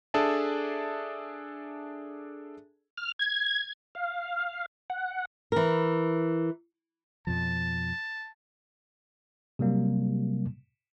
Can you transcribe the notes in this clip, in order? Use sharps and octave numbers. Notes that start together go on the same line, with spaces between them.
D4 G#4 A4 D5 E5 A5
F6
G#6
F5
F#5
E3 A#4
F2 B2 F3 A5
C3 F#3 G3 A#3